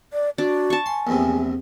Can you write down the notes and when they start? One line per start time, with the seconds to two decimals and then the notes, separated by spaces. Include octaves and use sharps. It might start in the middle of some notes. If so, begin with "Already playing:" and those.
0.13 D5
0.38 D4 F#4
0.70 A5 C#6
0.86 G#5 C6
1.07 A#1 E2 C3